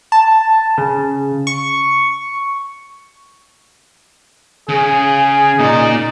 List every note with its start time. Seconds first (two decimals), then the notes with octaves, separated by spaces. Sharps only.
0.12 A5
0.78 C#3
1.47 C#6
4.69 C#3 G#4
5.59 A#2 D#4 D5